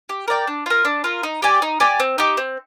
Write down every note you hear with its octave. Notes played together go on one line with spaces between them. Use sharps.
G4
A#4 D5 G5
D4
F4 A#4
D4
F4 A#4
D#4
G4 D5 G#5
D#4
G4 D5 G#5
C4
D#4 G4
C4